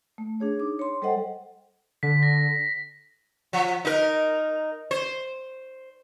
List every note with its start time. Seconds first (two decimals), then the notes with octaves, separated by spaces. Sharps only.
0.18 A3
0.40 D4 G#4 C#5
0.59 D#4 D6
0.79 C#5 C6
1.02 G3 A4 C5 D#5 F#5 G5
2.03 D3 B6
2.23 A#6
3.53 F3
3.85 D#4 A#4
4.91 C5